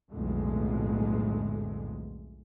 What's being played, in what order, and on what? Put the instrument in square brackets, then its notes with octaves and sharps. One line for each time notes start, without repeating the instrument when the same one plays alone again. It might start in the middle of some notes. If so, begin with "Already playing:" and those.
[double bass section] B1 F2 A2 D3 G#3 A3